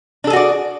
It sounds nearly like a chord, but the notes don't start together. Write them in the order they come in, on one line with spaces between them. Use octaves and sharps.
D4 A4 G#4 F#4 D5